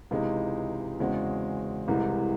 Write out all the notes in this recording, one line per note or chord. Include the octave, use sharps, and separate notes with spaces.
C#2 C3 E3 G#3 D#4
E2 C#3 G#3 C4 F#4
C2 C3 E3 G#3